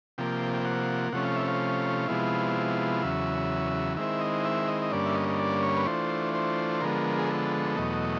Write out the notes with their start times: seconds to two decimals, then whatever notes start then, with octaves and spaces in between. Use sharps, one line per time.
0.18 C3 F3 A#3 G5
0.54 G5
0.65 F#5
1.12 C3 F3 A3 C#4 F#5
1.24 F5
1.36 E5
1.48 F5
2.08 C3 F3 G#3 B3 E4
3.02 E2 C#3 F#3 E5
3.97 D#3 G#3 C4 E4 E5
4.21 D#5
4.45 E5
4.68 D#5
4.82 D#5
4.92 G2 D3 G3 A#3 C#4 D5
5.06 E5
5.15 D#5
5.28 D#5
5.39 D5
5.62 C#5
5.76 B4
5.86 E3 A3 D4 F4 C5
6.34 C5
6.81 D3 F3 G#3 B3 A#4
7.19 G#4
7.29 A4
7.76 E2 B2 F#3 A3 D#5